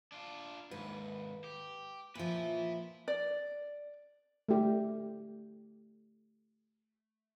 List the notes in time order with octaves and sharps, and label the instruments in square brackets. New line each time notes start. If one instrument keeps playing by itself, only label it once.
[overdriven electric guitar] D4 F4
[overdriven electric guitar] D#2 G#2 [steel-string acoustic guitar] B4
[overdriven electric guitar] G4
[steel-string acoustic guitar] A#2 F3 [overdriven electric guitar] E4 B4
[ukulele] D5
[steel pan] A3 G4